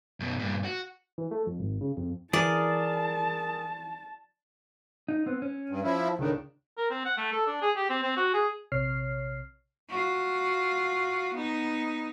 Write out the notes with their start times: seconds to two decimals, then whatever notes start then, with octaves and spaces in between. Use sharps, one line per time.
0.20 F#2 B2
0.39 G2 A#2
0.65 F#4
1.18 E3
1.31 A3
1.46 F2
1.59 G#1
1.81 C#3
1.97 F2
2.33 E3 G#4 A#4 D5 A5
5.08 D#4
5.26 B3 C4
5.42 C#4
5.69 G2
5.84 F3 E4
6.19 C#2 A2 D#3 D4
6.78 A#4
6.90 C4
7.05 F#5
7.18 A3
7.33 A4
7.47 D4
7.62 G#4
7.77 G4
7.90 C4
8.03 C4
8.17 F#4
8.34 G#4
8.72 A#1 C3 C#5 F6 C7
9.89 F4 F#4
11.34 B3 D#4